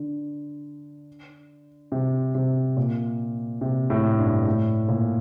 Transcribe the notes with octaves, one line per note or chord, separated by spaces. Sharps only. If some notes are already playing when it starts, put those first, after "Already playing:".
Already playing: D3
C3
C3
A#2
C3
A2
G2
A2
A#2